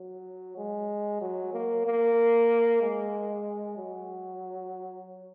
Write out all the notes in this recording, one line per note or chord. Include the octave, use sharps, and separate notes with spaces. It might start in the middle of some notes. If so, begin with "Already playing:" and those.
Already playing: F#3
G#3
F#3
A#3
A#3
G#3
F#3